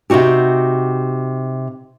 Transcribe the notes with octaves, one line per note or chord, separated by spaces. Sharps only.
C3 C4 D#4 F#4 G4